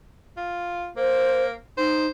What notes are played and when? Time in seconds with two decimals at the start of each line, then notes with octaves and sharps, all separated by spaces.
0.37 F4
0.97 A#3 C5
1.78 D#4 C5